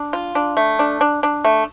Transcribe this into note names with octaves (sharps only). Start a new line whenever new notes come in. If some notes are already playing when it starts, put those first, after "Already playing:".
Already playing: D4
F4
D4
A3
D4
D4
D4
A3